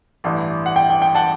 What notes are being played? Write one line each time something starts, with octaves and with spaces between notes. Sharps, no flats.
A1 G2 E3
F#5
G5
G5
G5
F#5 A5